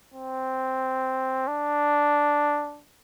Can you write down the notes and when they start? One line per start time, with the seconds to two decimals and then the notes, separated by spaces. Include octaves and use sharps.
0.14 C4
1.47 D4